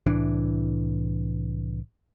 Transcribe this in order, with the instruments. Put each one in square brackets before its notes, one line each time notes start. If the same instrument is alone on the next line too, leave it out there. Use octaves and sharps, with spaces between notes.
[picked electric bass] C2 A2 E3 D4